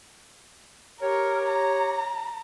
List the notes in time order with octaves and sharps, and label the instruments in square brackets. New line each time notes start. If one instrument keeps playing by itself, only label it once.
[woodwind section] G4 C#5 [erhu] A#4
[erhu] A#5